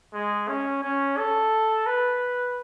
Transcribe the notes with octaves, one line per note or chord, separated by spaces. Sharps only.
G#3
C#4
C#4
A4
B4